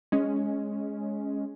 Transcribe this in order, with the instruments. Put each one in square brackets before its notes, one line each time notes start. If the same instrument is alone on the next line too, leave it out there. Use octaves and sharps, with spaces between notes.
[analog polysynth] G#3 C#4